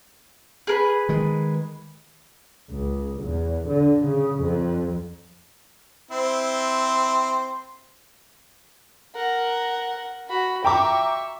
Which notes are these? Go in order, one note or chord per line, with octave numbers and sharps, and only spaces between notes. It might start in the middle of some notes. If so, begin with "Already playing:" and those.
G#4 A#4 B4
D#3 G#3
C#2
E2
D3
C#3
F2
C4 E4 C5
A#4 F#5
F#4 B5
E5 G5 A#5 C#6 D6